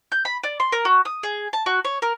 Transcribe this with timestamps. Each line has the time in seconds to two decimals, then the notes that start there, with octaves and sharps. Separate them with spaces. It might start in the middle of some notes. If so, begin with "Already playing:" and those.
0.12 G6
0.25 B5
0.44 D5
0.60 C6
0.72 A#4
0.85 F#4
1.05 D#6
1.23 G#4
1.53 A5
1.66 F#4
1.85 C#5
2.02 A#4